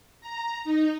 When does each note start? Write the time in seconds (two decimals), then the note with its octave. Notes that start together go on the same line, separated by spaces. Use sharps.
0.21 A#5
0.64 D#4